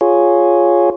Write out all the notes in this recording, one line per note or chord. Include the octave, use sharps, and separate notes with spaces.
F4 G#4 C#5